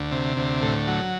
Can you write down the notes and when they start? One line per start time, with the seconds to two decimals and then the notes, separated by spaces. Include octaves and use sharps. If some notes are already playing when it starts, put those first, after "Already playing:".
Already playing: D2
0.12 C3
0.37 D2
0.62 A2
0.88 F#3